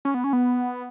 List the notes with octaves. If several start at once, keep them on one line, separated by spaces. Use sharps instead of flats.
C#4
B3
C#4
B3